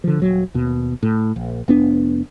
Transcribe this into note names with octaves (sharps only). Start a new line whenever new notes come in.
D3 F3
D#1 F#3
D#2 B2
A2
A#1
F1 B3 D4